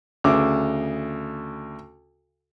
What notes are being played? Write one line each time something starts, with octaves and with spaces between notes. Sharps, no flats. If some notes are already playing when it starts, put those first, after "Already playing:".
D2 C#3 D6